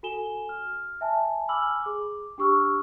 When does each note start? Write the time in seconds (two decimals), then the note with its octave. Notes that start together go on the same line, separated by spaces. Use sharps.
0.03 F#4 A4 G#5 E7 G7
0.49 F6
1.01 E5 G#5 A5
1.48 G#5 B5 D6 E6 F6 F#7
1.82 G#4 D6
2.38 D4 G4 C#6 E6 F6